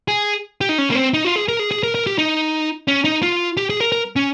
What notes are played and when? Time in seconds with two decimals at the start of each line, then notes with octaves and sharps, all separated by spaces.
0.08 G#4
0.61 G4
0.69 D#4
0.78 C#4
0.90 A#3
0.95 C4
1.14 D#4
1.25 F4
1.36 G#4
1.48 A#4
1.59 G#4
1.71 G#4
1.83 A#4
1.95 A#4
2.07 G4
2.18 D#4
2.88 C#4
3.05 D#4
3.23 F4
3.57 G4
3.70 G#4
3.81 A#4
3.92 A#4
4.16 C#4